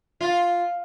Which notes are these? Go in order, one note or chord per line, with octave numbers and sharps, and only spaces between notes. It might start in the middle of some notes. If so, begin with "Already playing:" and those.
F4